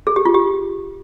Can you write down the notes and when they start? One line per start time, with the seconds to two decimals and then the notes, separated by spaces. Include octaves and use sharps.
0.07 G#4
0.16 G4
0.25 F4
0.34 G4